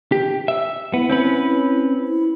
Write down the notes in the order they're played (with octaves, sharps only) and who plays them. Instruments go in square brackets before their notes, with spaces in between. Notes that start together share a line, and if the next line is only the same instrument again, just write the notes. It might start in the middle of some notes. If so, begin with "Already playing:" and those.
[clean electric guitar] G4
E5
[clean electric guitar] B3 [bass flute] E4
[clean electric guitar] C4 C#4 B4
[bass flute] E4